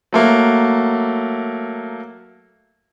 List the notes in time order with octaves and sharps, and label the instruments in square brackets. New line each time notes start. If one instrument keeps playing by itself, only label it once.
[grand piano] F#3 A3 A#3